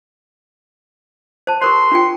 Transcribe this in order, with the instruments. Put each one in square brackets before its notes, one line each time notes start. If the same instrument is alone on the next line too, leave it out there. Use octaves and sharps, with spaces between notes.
[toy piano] C5 A5
[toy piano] G4 A#4 C5 [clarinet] C6
[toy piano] D4 F4 G5